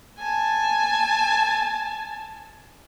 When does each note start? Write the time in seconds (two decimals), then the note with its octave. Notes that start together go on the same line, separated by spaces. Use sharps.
0.19 G#5 A5